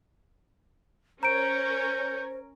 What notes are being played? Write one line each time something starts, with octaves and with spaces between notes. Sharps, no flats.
C#4 A#4 C5 C#5 A#5 G6 D7